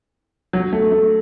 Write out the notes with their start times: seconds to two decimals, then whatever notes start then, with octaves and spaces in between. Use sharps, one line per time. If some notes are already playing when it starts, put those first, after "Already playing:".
0.53 F#3
0.73 A3
0.92 A3